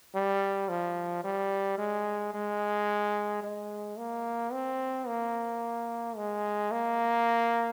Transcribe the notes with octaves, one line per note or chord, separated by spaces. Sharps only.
G3
F3
G3
G#3
G#3
G#3
A#3
C4
A#3
G#3
A#3